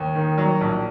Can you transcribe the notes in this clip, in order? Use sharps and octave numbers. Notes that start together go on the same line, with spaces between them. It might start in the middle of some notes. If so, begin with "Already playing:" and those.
Already playing: D#2
D#3
F#3
A#1